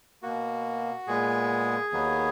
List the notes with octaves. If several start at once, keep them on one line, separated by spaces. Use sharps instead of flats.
B2 A#3 F#4
A#2 G#3 B3 G#4
D#2 D#3 F#3 B3